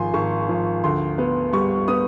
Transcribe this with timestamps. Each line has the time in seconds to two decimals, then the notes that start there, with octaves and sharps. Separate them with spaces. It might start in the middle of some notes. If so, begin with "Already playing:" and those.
Already playing: G#1 F3 G#5 C6
0.14 G#1 C#6
0.49 F3
0.84 D2 C6
1.18 B3
1.53 G3 C#6
1.88 B3 D#6